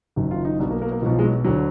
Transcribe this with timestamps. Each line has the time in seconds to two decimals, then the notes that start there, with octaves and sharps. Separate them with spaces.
0.16 F#1 F#2 D#3
0.31 F4
0.45 D#4
0.59 B1 B2 D4
0.70 A#3
0.82 A#3
0.92 A#3
1.02 B2 F3
1.06 B1
1.12 F3
1.19 G#3
1.24 F#3
1.45 D2 D3 F#3